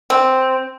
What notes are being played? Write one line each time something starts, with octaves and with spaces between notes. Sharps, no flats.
C4